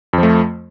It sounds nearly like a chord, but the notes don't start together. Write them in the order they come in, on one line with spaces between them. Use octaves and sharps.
F2 F3 A3